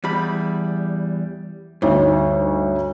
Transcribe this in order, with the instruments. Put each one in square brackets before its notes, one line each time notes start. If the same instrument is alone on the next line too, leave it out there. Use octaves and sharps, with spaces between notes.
[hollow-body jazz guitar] E2 G3 B5
[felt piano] D2 D#4 C#5 [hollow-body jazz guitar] G2